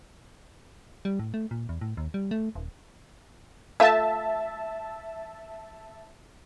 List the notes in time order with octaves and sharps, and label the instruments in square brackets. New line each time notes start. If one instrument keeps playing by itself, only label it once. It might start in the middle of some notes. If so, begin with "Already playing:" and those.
[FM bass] G3
A2
A3
A#2
E2
A2
D#2
G3
A3
D#1
[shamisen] A3 F4 [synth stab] E5 A5